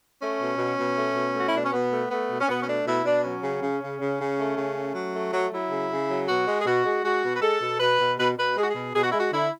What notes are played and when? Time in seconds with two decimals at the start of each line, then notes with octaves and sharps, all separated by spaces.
0.21 A3 C#4
0.40 B2
0.58 B2
0.78 B2
0.96 A3
1.15 B2
1.34 A3 F#4
1.48 E4
1.54 B2 D4
1.64 C#4
1.73 B2 B3
1.92 A3
2.10 A3 B3
2.30 B2
2.40 C#4
2.48 B2 B3
2.61 C#4
2.67 A3 D4
2.86 B2 E4
3.05 B2 D4
3.24 F#3 C#4
3.43 C#3
3.62 C#3
3.81 C#3
3.99 C#3
4.20 C#3
4.38 A3
4.57 C#3
4.76 A3
4.95 F#3
5.14 A3
5.33 F#3
5.52 F#3 E4
5.71 C#3
5.90 C#3
6.09 F#3
6.27 B2 F#4
6.46 G#3
6.59 G#4
6.66 B2 F#4
6.85 G#3
7.04 G#3 F#4
7.22 B2
7.33 B4
7.42 G#3 A4
7.61 B2
7.79 B2 B4
7.99 B2
8.18 B2 B4
8.37 B2 B4
8.56 G#3 G#4
8.63 F#4
8.70 B2 G#4
8.93 B2 G#4
9.02 F#4
9.11 G#3 E4
9.19 F#4
9.32 D3 E4